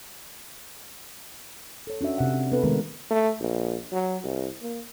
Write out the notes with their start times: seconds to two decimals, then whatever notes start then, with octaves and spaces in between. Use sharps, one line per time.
1.87 A4 C#5
2.01 C#4 D4 F#4 E5
2.18 C3 G4 E5 F#5
2.52 B3 D4 A4 B4
2.64 D#3 G#3 A3 B3 A#4 B4
3.11 A3
3.40 A#1
3.92 F#3
4.24 C2
4.62 A#3